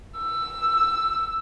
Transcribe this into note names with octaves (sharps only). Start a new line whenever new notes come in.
E6